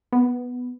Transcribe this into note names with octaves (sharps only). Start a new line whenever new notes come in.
B3